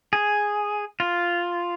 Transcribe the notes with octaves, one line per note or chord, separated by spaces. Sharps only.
G#4
F4